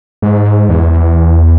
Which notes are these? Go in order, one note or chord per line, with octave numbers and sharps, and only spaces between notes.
G#2
E2